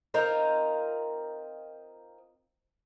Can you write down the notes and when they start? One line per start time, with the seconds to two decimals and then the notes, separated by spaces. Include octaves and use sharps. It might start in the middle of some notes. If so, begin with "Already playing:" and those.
0.14 C4 D#4 F4 A#4